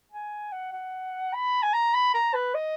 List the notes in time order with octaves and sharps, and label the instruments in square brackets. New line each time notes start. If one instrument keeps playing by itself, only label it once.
[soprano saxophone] G#5
F#5
F#5
B5
G#5
A#5
B5
A#5
B4
D#5